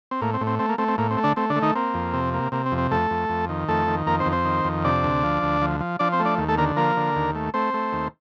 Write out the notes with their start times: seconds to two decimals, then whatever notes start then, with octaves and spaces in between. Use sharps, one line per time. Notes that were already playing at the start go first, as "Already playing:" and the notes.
0.11 C4
0.22 A2 A#3
0.34 C4
0.41 A2
0.47 C4
0.59 A3 C4
0.69 A#3
0.78 A3 C4
0.88 C4
0.98 A2 A#3
1.11 C4
1.17 A3
1.23 D3 D4
1.36 A3 C4
1.50 D3 D4
1.56 A3
1.62 D#3 D#4
1.75 A#3 C4
1.94 F2
2.14 C3
2.34 A#3
2.52 C3 A#3
2.66 C4
2.72 F2
2.78 C4
2.91 F2 A3 A4
3.11 F2
3.29 F2
3.49 D#3
3.68 F2 A3 A4
3.88 D#3
4.06 F2 A#3 A#4
4.20 C4 C5
4.26 F2
4.32 C4 C5
4.45 D#3
4.65 F2
4.84 C3 D4 D5
5.03 D2
5.23 F3
5.43 D2
5.62 F3
5.80 F3
5.99 F3 D4 D5
6.12 C4 C5
6.20 A3
6.25 D4 D5
6.38 D#2
6.48 A3 A4
6.58 D3 A#3 A#4
6.77 F3 A#3 A#4
6.97 D3
7.16 D#2
7.35 A3
7.54 A3 C4 C5
7.74 A3
7.93 D#2